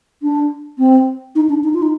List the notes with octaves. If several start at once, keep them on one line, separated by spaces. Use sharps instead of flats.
D4
C4
D#4
D4
D#4
F4
D#4